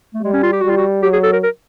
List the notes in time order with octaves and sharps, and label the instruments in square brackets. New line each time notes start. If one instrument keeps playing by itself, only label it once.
[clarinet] A3
[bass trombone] G3 [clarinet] G#3
[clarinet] C#4
F4
G4
[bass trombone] G3 [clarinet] F#4
[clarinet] F4
F#4
[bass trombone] F#3 [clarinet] G4
[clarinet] G#4
A4
A#4
A#4